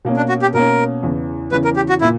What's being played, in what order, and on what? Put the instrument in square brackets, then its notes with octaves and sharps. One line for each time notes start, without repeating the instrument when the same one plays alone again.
[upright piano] B2 A#3 C#4
[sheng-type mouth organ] D4
F#4
G4
[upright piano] B2 A#3 C#4 [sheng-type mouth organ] A#4
[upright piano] E2 C#3 E3
[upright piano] E2 C#3 E3 [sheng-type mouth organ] B4
[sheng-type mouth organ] A#4
G4
F#4
[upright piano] A#2 A#3 [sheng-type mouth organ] E4